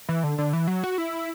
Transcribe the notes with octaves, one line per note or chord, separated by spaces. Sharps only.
E3
D3
D3
E3
F#3
F#4
E4